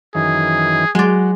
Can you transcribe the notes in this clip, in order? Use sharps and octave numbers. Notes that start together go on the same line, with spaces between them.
F#2 D#3 E3 G#4
F#3 G#3 F#4 D5